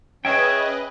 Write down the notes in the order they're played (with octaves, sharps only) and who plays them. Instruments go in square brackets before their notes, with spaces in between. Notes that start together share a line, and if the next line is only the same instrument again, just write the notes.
[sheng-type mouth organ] C#4 [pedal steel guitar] G#4 E5 G5 [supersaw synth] B4 D#5 [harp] G#6